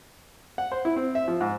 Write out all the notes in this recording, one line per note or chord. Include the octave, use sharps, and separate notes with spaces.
F#5
C5
E4
C4
E5
F3
G#2